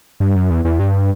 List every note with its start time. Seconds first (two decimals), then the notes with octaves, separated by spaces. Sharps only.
0.20 G2
0.36 F#2
0.50 E2
0.65 E2
0.79 G2